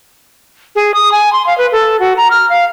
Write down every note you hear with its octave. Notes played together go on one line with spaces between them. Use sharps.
G#4
D#6
G#5
C6
F5
B4
A4
F#4
A#5
F6
F5